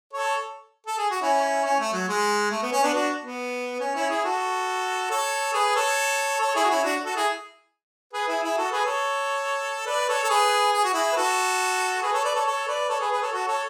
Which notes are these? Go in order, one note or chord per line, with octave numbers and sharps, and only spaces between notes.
A4 C#5
A4
G#4
F#4
C#4 E4
C#4
A3
F#3
G#3
A3
B3
C#4
B3 D4
D4 F#4
B3
C#4
C#4 E4
E4 G#4
F#4 A4
A4 C#5
G#4 B4
A4 C#5
A4 C#5
E4 G#4
F#4
C#4 E4
D4 F#4
F#4 A4
E4 G#4
G#4 B4
E4 G#4
E4 G#4
F#4 A4
G#4 B4
A4 C#5
B4 D5
A4 C#5
A4
G#4 B4
G#4
F#4
E4 G#4
B4
F#4 A4
G#4 B4
A4 C#5
B4 D5
A4 C#5
A4 C#5
B4 D5
A4 C#5
G#4 B4
G#4 B4
A4 C#5
F#4 A4
A4 C#5